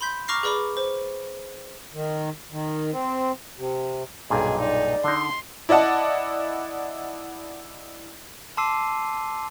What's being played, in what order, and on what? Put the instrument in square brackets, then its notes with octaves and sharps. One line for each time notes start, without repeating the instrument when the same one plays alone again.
[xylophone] B5 C6 G6 B6
A#5 C#6 D6 F6 A#6 C7
G#4 B4 D5 B5 D6
C5
[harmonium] D#3
D#3
C4
C3
[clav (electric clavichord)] B1 G2 A#2 [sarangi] G#4 [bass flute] D#5
[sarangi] D#4 [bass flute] D5
[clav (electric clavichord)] D3 D#4 [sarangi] C6
[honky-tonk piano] E4 D5 D#5 F#5 A5
[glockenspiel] A5 C6 D6 E6 C7 D#7